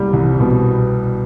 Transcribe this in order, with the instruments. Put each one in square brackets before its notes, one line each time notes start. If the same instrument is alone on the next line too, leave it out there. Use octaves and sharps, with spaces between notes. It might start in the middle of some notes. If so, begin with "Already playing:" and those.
Already playing: [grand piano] C2 G3
C2
B2